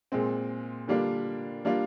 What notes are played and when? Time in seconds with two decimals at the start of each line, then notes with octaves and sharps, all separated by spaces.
0.12 A#2 G#3 C4
0.88 D3 G3 A#3 D4 F4
1.65 G3 A#3 D4 F4